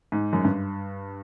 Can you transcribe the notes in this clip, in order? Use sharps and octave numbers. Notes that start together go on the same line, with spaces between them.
G#2
F#2
G2